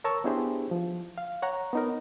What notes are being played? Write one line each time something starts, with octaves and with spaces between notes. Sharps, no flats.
A#4 C#5 A5 A#5 C#6 E6
B3 D4 E4 G4 G#4 C5
F3
F5
C#5 F#5 A#5
B3 D#4 A#4